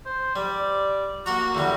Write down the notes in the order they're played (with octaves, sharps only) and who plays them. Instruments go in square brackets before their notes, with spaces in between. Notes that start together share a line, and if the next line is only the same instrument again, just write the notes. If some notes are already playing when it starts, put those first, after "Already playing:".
[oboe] C5
[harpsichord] G3 [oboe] D5
[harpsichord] A#3 F#5 A#5 [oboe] F#4
[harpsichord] E2 D3 G3